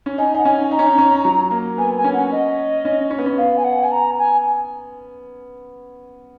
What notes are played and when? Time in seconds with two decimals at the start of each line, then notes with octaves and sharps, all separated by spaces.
0.06 C#4
0.18 D#4 G#5
0.35 D#4 F#5
0.44 C#4 G#5
0.71 D#4 A#5
0.79 C#4
0.86 D#4
0.98 C#4
1.25 F#3
1.51 A#3
1.78 B3 G#5
1.96 G#5
2.04 C#4
2.14 F#5
2.31 D#5
2.85 C#4
3.11 C#4
3.18 B3
3.26 C#4
3.37 B3 F5
3.57 G#5
3.64 F#5
3.83 G#5
3.92 A#5
4.18 G#5